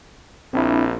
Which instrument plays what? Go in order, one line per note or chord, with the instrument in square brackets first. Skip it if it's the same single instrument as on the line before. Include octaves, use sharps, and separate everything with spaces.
[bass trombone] A#1 [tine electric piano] C4 D4 E4